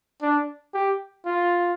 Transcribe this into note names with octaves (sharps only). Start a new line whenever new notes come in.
D4
G4
F4